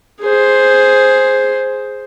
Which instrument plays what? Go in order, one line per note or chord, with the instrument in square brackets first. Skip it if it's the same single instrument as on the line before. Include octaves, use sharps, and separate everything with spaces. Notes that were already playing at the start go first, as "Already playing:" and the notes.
[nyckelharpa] G#4 C5